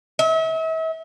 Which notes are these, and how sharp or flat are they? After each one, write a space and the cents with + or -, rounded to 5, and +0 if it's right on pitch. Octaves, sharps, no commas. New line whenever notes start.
E5 -40